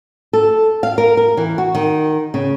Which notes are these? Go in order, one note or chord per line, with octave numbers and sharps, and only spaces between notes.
A4
F5
A#4
A#4
E3
F#4
D#3
C#3